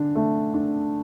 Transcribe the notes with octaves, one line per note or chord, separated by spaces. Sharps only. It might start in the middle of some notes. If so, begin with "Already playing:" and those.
Already playing: D3 D4
A3
D4